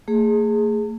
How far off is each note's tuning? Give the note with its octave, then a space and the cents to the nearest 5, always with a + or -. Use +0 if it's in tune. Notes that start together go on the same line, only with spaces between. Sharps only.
A3 +45 G#4 +0